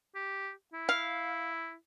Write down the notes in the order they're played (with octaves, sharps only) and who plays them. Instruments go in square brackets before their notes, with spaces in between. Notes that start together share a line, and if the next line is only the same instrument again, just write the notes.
[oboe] G4
E4
[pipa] F5